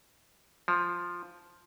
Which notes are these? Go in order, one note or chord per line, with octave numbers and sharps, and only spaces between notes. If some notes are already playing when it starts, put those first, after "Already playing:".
F3